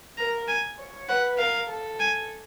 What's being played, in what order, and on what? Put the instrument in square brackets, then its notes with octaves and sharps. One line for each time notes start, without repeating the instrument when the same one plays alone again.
[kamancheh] A#4 [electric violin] A#5
[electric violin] G#5
[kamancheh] C#5
[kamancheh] B4 [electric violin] F#5
[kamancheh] A#4 [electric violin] F5
[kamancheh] A4
[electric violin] G#5